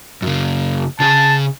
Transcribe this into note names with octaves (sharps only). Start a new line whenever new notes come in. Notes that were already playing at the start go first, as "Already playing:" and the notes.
F#2 C#3
C#3 G#4 A5